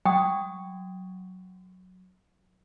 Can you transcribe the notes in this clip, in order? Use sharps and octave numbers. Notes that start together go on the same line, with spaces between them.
F#3 G5 D#6